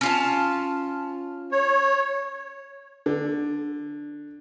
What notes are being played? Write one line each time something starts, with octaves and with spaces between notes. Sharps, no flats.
C#4 F4 A5
C#5
D3